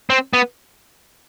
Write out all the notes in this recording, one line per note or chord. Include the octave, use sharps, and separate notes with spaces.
C4
B3